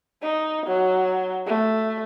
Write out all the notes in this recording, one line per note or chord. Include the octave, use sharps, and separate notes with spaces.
D#4
F#3
A3